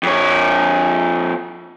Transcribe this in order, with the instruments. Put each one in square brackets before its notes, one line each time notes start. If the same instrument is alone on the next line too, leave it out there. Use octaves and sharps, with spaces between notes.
[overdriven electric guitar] F2 C#5